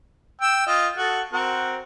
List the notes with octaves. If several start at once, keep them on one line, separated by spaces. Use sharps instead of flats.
G5 E6
F4 D#5
F#4 A4
C4 F#4 A#4